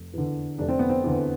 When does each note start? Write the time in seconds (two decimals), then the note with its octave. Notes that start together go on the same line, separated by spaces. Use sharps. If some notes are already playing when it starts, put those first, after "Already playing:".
Already playing: F1
0.13 E2 D3
0.58 F1 D4
0.69 C4
0.79 B3
0.89 C4
1.04 E2 D3